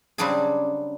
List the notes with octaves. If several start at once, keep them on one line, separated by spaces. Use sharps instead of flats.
C#3 F#3 G3 C4 D4 G#4